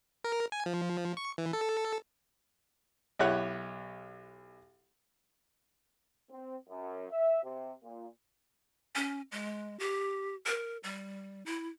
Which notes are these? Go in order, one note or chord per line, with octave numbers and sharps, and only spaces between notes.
A#4
G#5
F3
C#6
E3
A4
B1 E4 G4 C#5 F#5 F#6
C4
F#2
E5
C3
A#2
C#4
G#3
G4
A#4
G3
E4